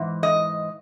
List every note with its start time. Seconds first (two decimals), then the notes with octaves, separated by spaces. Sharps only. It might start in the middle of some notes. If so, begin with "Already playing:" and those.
Already playing: G#2 E3
0.23 D#5